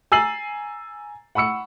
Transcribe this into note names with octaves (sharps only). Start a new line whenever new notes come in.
G#5 A#5 E6 A6 C7 F#7
F#5 B5 C#6 E6 C#7